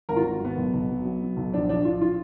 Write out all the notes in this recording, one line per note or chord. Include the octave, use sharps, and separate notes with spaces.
G#1 A#4
F4
G#1 F#4
G#1 B3
B1
B1
F#3
F#3
F#3
B1
A#1 D4
A#1 D4
A#1 F4
F4